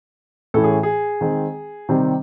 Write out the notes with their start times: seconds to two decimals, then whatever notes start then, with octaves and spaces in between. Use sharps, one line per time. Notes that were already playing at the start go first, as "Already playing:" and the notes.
0.54 A2 E3 A3 C#4 E4 A4
0.64 G#4
0.83 G#4
1.21 D#3 G#3 C4
1.89 C3 D#3 G3 C4